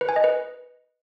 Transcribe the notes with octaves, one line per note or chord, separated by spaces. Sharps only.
B4
G#5
D#5
B4